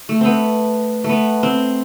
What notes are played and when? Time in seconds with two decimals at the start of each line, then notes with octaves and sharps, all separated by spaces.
0.09 A3
0.21 B3 C4
1.04 A3 B3
1.43 C4